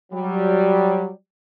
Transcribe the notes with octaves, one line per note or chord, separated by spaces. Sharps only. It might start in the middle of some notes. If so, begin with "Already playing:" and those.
F#3 G3